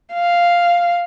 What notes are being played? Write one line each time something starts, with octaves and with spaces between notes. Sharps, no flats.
F5